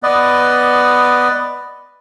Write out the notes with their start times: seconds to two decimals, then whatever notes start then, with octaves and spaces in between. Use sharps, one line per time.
0.03 B3 B4 D5 D#5